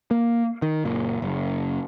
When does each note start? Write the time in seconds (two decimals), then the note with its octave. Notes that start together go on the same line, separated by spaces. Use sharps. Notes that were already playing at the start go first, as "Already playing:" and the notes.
0.11 A#3
0.62 D#3
0.84 F#1 A#2
1.22 F#1